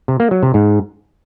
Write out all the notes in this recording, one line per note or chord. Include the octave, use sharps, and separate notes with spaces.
C3
A#3
F#3
C3
G#2